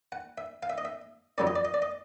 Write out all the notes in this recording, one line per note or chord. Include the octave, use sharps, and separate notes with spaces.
F#5
E5
F5
E5
D#5
E5
F2 D3 F#3 A3 C#4 D5
D#5
D5
D#5
D5
D#5